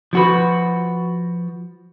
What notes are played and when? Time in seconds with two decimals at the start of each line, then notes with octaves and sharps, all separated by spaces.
0.13 F3 F#4 B4